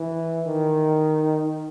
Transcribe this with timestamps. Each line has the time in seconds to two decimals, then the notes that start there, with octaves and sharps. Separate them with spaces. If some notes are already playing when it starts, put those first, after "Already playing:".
Already playing: E3
0.47 D#3